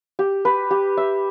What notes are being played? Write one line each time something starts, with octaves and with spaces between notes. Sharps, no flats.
G4
B4
G4
E5